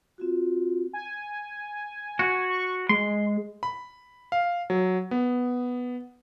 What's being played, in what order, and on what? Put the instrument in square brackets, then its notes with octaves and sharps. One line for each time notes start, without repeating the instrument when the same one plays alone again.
[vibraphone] C4 F4 F#4
[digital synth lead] G#5
[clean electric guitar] F#4
[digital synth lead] C#6
[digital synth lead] G#3 [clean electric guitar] C6
[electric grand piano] B5
F5
F#3
B3